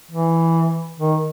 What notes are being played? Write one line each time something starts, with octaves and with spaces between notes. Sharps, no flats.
E3
D#3